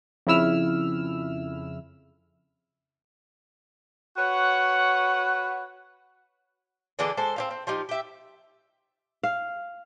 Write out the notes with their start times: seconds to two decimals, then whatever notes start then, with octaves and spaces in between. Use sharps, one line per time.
0.27 F2 C#3 E4 E6 F6
4.17 F#4 B4 C#5 F#5
6.99 D3 E3 G#3 D4
7.17 G#3 A4 C5
7.36 C4 D#4 F5
7.51 C4
7.67 F3 G3 D#4
7.89 G4 E5
9.23 F5